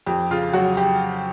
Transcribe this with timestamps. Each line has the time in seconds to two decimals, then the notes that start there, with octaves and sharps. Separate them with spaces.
0.06 F2 G4
0.31 C#3 F4
0.54 F#3 F#4
0.77 G4